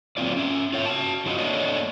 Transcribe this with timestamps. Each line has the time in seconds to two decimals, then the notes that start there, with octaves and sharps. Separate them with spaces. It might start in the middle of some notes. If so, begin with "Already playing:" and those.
0.17 F#3 A#3 C4 F4 D5
0.36 C#4 E5
0.73 F4 C#5 E5
0.86 F#4 A5
1.26 F#3 F4 F#4 D#5
1.38 A3 A#3 D4 C#5 D#5